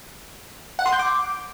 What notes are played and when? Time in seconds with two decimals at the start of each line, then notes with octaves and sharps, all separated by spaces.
0.79 F#5
0.86 C6
0.92 G6
0.99 D6